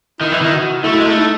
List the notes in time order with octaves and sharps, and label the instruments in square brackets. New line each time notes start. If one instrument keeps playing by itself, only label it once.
[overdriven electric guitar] D#3 [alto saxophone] E4
[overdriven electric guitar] E3
[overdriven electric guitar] D#3 [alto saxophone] E4
[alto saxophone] F#4
[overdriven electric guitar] A3 [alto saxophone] E4
[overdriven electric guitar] G#3
A3
[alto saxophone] D#4